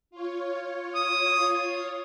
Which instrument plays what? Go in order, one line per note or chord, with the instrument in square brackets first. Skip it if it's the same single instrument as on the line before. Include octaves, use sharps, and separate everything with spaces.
[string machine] F4 C#5
[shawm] D#6